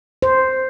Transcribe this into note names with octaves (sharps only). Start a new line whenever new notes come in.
C5